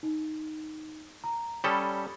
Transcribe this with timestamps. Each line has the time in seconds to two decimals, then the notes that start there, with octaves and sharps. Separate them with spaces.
0.03 D#4
1.24 A#5
1.64 G3 C#4 A4 B5 D#6 G7